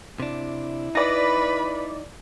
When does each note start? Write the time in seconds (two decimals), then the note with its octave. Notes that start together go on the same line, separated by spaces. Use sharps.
0.20 C3 D4 E4
0.95 D#4 B4 D5 B5 A#6